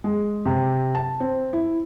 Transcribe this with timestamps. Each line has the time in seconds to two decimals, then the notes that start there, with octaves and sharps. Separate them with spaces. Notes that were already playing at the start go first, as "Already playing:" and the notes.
0.04 G#3
0.46 C3
0.95 A5
1.20 C4
1.53 E4